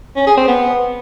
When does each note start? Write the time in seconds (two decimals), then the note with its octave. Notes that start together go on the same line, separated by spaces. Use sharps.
0.16 C#4
0.27 G#4
0.37 C4
0.48 B3